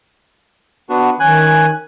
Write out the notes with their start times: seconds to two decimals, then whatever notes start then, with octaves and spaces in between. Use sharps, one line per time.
0.89 B3 D4 F#4
1.20 D#3 C#4 G#5 F#6